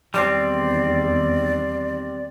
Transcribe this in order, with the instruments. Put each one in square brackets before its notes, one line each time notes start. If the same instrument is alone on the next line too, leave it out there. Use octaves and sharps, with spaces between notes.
[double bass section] E2 D#3 [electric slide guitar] G3 C4 [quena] D5